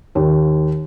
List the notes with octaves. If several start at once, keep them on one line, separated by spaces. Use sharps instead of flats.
D#2